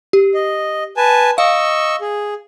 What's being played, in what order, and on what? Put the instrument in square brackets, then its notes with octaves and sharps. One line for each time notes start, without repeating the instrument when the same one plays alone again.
[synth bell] G4
[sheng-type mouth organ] D#5
B4 G#5 A5
[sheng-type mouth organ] D#5 C#6 E6 [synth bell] F5
[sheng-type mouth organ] G#4